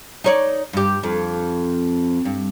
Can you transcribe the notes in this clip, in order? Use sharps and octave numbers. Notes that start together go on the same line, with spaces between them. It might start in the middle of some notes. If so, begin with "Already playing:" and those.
D#4 C#5 D5
G2 G4
F2
G2